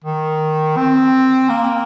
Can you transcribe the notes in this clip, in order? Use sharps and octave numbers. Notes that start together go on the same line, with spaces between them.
D#3
C4
A#3